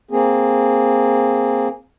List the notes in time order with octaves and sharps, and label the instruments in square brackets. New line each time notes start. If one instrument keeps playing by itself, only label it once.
[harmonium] A#3 C4 G#4